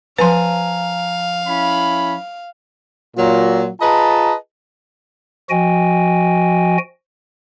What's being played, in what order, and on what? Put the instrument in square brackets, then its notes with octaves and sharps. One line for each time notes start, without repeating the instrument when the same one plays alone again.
[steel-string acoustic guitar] F3 G#5 A#5 [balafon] B4 C6 [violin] F5
[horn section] C#4 E4 B5
A#2 F#3 F4
F4 G#4 B4 D#5 A5 A#5
[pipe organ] F3 F#4 D#5 G5 G#5